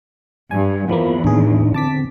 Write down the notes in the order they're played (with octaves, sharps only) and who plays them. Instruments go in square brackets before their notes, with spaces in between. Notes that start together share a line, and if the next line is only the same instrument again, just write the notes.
[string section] G2 [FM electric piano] G#5
[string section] E2 [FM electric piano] E3 F3 A#3 [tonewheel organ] B5
[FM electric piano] D#2 G#4 [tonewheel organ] A2 D4 D#4
[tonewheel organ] D3 C4 [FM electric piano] A5 D6 B6